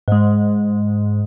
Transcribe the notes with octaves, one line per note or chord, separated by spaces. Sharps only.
G#2 G#3